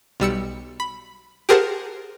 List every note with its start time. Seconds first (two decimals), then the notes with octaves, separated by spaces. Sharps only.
0.20 B1 G3 E6 C#7
0.80 B5
1.49 G4 G#4 A#4 C5 F#5 A5